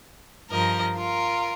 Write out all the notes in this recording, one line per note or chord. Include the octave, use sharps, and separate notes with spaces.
G2 F3 A#4 D#5
F4 A#4